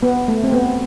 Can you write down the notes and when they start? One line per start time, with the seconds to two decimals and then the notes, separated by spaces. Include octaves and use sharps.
0.03 B3
0.28 A3
0.44 C4
0.53 B3